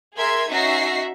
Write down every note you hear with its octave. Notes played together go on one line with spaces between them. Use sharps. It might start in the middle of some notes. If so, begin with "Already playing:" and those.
G#4 A#4 E5 C6 G#6
C#4 D#4 F#4 E5 A#6 C7